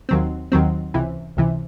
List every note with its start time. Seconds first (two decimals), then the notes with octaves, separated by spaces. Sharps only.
0.09 D#2 D#3 F#3 C4
0.52 D#2 D#3 F#3 C4
0.94 C#2 C3 E3
1.37 C#2 C3 E3